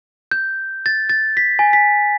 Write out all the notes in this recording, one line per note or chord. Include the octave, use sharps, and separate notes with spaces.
G6
A6
A6
B6
G#5
B6